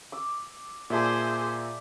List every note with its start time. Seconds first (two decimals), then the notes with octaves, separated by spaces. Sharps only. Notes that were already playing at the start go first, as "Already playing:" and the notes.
0.12 D6 E6
0.90 A#2 G#4 C5 D5 E5 A5